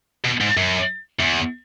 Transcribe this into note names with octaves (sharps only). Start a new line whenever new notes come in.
B2
G#2
F#2
E2